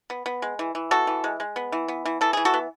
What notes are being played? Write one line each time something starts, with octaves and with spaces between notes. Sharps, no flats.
B3
B3
G#3
E3
E3
B3 F#4 A4
E3
G#3
G#3
B3
E3
B3
E3
E3 A4
E3 G#4
F#4 A4
B3